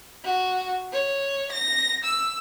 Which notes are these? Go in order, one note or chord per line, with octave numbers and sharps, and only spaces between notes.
F#4
C#5
A#6
E6